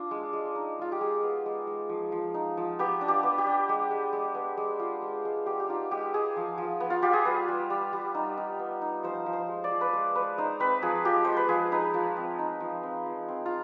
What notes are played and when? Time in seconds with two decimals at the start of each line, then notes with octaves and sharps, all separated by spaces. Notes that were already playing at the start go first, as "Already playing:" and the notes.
Already playing: D4 F4
0.11 G#3
0.33 G#3
0.55 D#4
0.79 G#3 F4
0.92 G4
1.01 G#3 G#4
1.23 B3
1.46 G#3
1.67 G#3
1.89 F3
2.12 F3
2.34 D#4
2.57 F3
2.79 B3 G4
3.01 D4
3.08 G4
3.23 B3
3.38 G4
3.47 D4
3.69 G#3
3.91 G#3
4.13 G#3
4.35 B3
4.57 G#3
4.80 F4
5.02 G#3
5.25 G#3
5.46 B3 G4
5.60 G4
5.69 D#4 F4
5.91 G#3 G4
6.14 G#3 G#4
6.36 F3
6.58 F3
6.80 B3
6.90 F4
7.02 F4 G4
7.13 G#4
7.25 G3 B4
7.48 G3
7.70 G3
7.93 G3
8.14 D#4
8.38 D#4
8.59 B3
8.82 D#4
9.03 F3 C5
9.26 F3
9.33 C5
9.49 G#3
9.64 D5
9.71 F3
9.81 B4
9.93 G#3 C5
10.15 G#3 B4
10.38 D#4 C5
10.60 C4 B4
10.82 F3 G#4
11.05 F3 G4
11.25 G#3 C5
11.37 B4
11.49 F3 G#4
11.72 D#4 B4
11.94 F3
12.17 C4
12.39 D#4
12.60 F3
12.83 C4
13.06 F3
13.28 C4
13.46 F4